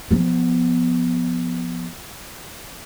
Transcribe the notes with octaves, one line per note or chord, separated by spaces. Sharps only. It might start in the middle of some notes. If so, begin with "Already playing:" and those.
F3 B3